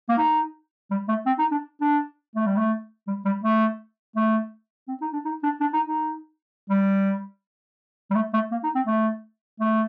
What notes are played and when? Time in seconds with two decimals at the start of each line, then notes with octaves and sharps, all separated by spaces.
0.09 A#3
0.18 D#4
0.91 G3
1.08 A3
1.26 C4
1.39 D#4
1.51 D4
1.81 D4
2.36 A3
2.46 G3
2.57 A3
3.07 G3
3.25 G3
3.44 A3
4.16 A3
4.88 C4
5.01 D#4
5.13 D4
5.25 D#4
5.43 D4
5.61 D4
5.73 D#4
5.86 D#4
6.70 G3
8.10 G3
8.15 A3
8.33 A3
8.52 A#3
8.63 D#4
8.75 C4
8.87 A3
9.60 A3